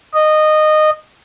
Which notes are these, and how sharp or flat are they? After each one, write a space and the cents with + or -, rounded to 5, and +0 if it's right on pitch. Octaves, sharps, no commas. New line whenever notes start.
D#5 -15